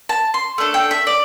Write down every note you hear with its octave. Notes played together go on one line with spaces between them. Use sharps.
A5
C6
A3 D4 A4
G5
E5
D5